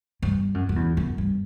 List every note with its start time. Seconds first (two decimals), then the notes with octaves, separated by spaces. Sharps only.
0.22 G2
0.54 F#2
0.69 F#2
0.76 E2
0.97 F#2
1.18 G2